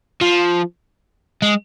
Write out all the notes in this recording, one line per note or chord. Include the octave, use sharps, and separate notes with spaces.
F3
G#3